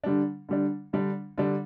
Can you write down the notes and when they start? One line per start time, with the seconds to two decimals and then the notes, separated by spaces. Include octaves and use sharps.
0.04 D3 G3 D4
0.49 D3 G3 D4
0.93 D3 G3 D4
1.38 D3 G3 D4